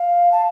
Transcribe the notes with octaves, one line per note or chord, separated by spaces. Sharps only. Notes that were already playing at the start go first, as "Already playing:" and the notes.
Already playing: F5
A5